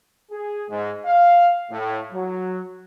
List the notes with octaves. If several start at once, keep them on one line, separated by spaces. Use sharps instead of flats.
G#4
G#2
F5
A2
F#3